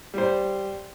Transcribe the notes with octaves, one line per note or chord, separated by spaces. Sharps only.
G3 C5